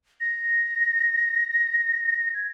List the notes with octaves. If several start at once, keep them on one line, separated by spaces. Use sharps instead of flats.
A#6
G#6